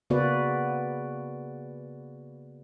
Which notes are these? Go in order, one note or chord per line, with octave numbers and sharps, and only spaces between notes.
C#3 A#3 B3 F#4 B4 D5